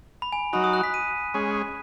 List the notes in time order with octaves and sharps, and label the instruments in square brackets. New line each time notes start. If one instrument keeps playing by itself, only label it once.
[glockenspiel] B5
G#5
[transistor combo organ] F#3 D#4 F#4 [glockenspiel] B5
[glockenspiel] D#6
F#6
B6
D#7
[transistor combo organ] G#3 C#4 G#4